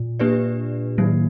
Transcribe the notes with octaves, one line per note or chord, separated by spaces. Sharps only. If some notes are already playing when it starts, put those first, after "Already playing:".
Already playing: A#2
A#3 D4 G4 B4 D5
A2 D#3 F#3 A#3